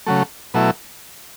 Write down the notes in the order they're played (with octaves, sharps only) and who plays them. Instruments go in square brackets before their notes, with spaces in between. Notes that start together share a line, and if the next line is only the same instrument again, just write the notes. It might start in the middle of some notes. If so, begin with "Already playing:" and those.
[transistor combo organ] C#3 F#3 A3
B2 F#3 A3 E4